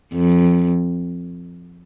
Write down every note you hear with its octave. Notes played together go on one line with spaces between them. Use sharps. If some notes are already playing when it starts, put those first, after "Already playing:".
F2